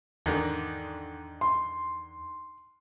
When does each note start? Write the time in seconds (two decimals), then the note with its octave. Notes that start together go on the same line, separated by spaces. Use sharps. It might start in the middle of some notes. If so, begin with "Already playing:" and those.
0.26 E2 G#2 D3 D#3
1.41 C6